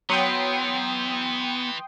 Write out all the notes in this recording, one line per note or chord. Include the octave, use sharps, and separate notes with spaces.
E3 F#3 B3 G5 C6 D#6